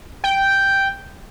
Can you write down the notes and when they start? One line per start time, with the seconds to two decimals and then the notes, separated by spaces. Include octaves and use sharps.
0.24 G5